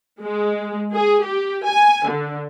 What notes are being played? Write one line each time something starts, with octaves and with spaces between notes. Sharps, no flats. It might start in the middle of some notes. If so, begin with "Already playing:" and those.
G#3
G#4
G4
G#5
D3